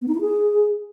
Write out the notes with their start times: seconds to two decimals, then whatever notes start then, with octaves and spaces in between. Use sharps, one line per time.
0.02 B3
0.08 D#4
0.14 E4
0.21 G#4